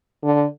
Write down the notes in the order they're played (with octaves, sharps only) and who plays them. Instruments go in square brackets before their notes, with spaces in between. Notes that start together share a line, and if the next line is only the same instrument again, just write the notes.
[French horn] D3